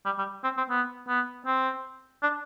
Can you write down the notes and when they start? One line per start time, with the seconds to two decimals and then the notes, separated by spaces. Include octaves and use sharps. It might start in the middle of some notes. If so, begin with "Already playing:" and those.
0.05 G3
0.18 G3
0.44 C4
0.57 C4
0.70 B3
1.08 B3
1.46 C4
2.23 D4